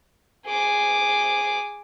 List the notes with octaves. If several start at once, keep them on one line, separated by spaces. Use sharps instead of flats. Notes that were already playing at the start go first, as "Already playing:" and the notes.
G#4 D6